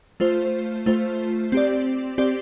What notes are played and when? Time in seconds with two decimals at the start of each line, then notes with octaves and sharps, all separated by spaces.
0.20 A3 F4 C5
0.86 A3 F4 C5
1.52 C4 G4 D5
2.18 C4 G4 D5